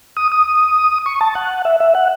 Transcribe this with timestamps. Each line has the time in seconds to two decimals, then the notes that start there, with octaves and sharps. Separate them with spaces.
0.17 D#6
0.32 D#6
1.06 C#6
1.21 A5
1.35 F#5
1.65 E5
1.80 E5
1.95 F#5